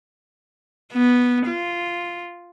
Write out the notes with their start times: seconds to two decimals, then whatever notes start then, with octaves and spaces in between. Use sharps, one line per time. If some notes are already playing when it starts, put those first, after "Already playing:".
0.93 B3
1.47 F4